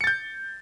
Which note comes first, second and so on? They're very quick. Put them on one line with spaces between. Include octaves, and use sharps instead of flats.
C#7 A6 G6